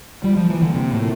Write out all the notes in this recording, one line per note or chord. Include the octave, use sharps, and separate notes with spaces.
G3 F4
F3
E3 A#3
D3
C3 F4
A2
A#4